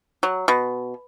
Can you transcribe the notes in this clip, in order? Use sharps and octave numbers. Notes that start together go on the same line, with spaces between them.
F#3
B2